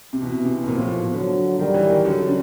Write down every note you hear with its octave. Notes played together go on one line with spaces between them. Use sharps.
C3
B2 E3
C3
B2
A#2 F3
A2
B2
D3 F#3
D#3 G3
E3
D#3
D3 F#3
D3
C#3